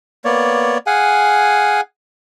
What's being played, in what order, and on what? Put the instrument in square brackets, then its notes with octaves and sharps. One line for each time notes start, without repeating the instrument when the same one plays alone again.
[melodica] A#3 B3 C#5 D5
G#4 F5 F#5 G#5